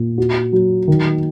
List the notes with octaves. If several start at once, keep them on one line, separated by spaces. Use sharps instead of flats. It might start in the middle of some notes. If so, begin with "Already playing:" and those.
Already playing: A#2
F#4
F#3
D#3